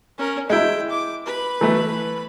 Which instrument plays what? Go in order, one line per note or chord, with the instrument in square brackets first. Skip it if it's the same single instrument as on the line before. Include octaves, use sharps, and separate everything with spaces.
[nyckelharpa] C#4 A#4
[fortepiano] G#3 E4 [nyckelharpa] G5
[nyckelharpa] D6
B4 B5
[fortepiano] E3 A3